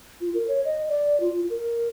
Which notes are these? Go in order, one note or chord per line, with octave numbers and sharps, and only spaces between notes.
F4
A#4
C#5
D#5
D5
F4
A#4